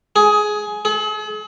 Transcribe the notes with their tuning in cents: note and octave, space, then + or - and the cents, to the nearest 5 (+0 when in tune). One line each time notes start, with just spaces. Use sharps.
G#4 +15
G#4 +45